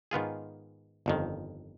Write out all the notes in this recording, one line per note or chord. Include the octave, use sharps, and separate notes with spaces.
G#2 D#3 B3 F4 G#4
G1 F2 D#3